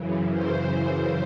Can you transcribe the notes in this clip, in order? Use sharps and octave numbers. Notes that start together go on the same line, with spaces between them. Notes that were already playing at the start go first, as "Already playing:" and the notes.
Already playing: F#2 C#3 E3
C5